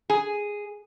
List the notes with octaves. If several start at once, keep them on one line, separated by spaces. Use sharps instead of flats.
G#4